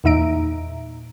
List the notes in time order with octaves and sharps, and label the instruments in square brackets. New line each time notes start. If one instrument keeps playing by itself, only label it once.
[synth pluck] E2 A#2 D#4 E5 A#5 D7